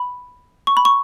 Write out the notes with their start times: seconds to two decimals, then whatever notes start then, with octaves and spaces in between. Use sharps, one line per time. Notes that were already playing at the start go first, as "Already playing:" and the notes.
Already playing: B5
0.67 C#6
0.77 B5
0.85 C#6